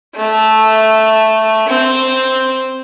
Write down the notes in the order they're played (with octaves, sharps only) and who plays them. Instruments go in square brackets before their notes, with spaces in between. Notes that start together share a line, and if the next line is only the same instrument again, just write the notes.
[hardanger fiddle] A3
C4